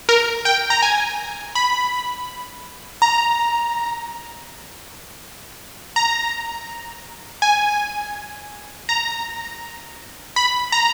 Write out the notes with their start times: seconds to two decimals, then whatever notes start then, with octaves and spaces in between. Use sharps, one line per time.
0.09 A#4
0.45 G5
0.70 A#5
0.82 G#5
1.55 B5
3.02 A#5
5.96 A#5
7.42 G#5
8.89 A#5
10.36 B5
10.72 A#5